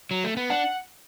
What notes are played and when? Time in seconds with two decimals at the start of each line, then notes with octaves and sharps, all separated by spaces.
0.11 F#3
0.24 A3
0.37 B3
0.50 D4 F#5